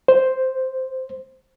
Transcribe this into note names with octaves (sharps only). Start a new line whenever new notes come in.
C5